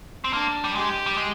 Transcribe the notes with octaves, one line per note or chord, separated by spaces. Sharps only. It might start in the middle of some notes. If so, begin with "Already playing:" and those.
C4
A#3 D4
G3
G#3 G4
G3
G#3